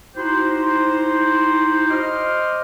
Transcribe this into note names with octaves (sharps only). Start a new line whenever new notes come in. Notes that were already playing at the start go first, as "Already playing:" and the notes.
D#4 E4 F#4 G4 C5
C5 D#5 C6 D6 F6